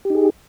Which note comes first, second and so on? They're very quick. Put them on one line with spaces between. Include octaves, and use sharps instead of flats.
G4 D#4 G#4